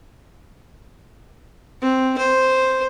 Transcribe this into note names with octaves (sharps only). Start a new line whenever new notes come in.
C4
C5